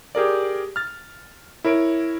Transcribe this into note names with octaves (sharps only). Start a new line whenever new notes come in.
G4 G#4 A#4 D5
F6 A6
E4 A#4 C#5 D7